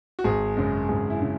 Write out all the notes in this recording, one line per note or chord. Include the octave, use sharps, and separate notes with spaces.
F#4
G#1 G#4
F#2 C#3 G#3
G#1 G#4
E4
C#3